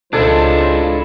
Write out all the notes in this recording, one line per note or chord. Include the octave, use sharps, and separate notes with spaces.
C#2 G#3 D4 E4 F4 A4 C5 G#5